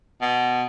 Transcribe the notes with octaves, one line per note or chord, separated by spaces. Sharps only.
B2